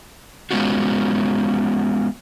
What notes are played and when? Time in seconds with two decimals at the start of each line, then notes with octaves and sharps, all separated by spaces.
0.51 G#3 B3 C#4 F4 F#4